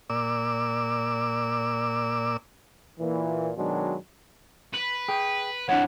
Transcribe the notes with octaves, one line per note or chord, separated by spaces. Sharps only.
A#2 D5 E6
A#2 E3
B2 D#3 F#3 G#3 D4
B4
G#4 G5
F2 D4 E4 C#5 F#5